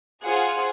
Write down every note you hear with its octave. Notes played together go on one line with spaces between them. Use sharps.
F4 G#4 C5 F#5